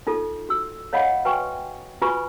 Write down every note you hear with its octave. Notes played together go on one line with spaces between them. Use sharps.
D#4 F4 A4
F#4 E6
C#5 D#5 F5 F#5 B5
F#4 B4 G5 G#5 C#6
F4 F#4 B4 G#5 B5 C#6